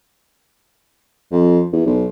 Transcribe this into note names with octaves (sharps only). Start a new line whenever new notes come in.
F2
E2
B1